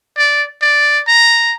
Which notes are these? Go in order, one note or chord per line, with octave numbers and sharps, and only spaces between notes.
D5
D5
A#5